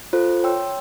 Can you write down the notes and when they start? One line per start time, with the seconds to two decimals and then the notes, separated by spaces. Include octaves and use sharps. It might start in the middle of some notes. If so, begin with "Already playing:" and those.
0.13 F4 A4 C5
0.44 C#5 G5 C6 E6